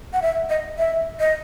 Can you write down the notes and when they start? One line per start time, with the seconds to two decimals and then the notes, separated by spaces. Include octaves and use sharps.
0.13 F#5
0.22 E5
0.50 D#5
0.78 E5
1.20 D#5